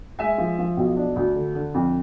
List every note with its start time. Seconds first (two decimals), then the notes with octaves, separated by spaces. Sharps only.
0.19 G#3 E5 G#5
0.38 F3
0.59 F3
0.77 B1
0.96 D4
1.16 D2
1.35 D3
1.55 D3
1.74 F2